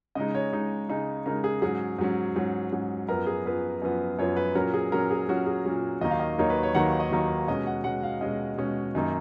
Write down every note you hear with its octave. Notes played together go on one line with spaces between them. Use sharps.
C#3 G#3 D#4 D#5
C#5
C#3 G#3 D#4
C#3 G#3 D#4
C#3 G#3 D#4 A#4
G#4
G#2 F#3 C#4 G#4
G#2 F#3 C#4
G#2 F#3 C#4
G#2 F#3 C#4
F#2 F3 B3 A#4
G#4
F#2 F3 B3 B4
F#2 F3 B3
F#2 F3 B3 C#5
B4
A#2 F#3 C#4 A#4
G#4
A#2 F#3 C#4 A#4
G#4
A#2 F#3 C#4 F#4
G#4
A#2 F#3 C#4
D#2 D#3 F#3 A#3 D#4 D#5
F5
D#5
D#2 D#3 F#3 A#3 D#4 C#5
B4
C#5
D#2 D#3 F#3 A#3 D#4 F#5
D#5
D#2 D#3 F#3 A#3 D#4
B2 G#3 C#4 D#5
F#5
B2 G#3 C#4 F#5
F5
B2 G#3 C#4 D#5
B2 G#3 C#4
F#2 D#3 A#3 D#4